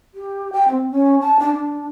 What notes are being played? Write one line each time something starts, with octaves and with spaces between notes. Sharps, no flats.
G4
G5
C4
C#4
A5
D4
D4